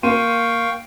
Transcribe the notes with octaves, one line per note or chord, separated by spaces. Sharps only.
A#3 F5 G5 C6 C#6 D#7